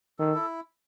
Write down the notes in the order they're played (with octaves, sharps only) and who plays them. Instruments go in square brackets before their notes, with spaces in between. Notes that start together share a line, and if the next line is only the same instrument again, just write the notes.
[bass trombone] D#3 [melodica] A4
[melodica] E4